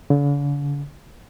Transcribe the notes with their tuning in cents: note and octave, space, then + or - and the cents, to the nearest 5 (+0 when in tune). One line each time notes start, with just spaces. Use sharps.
D3 -45